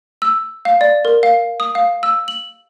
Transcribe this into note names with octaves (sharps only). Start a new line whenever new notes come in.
E6
F5
D5
A#4
F5
D#6
F5
E6
F#7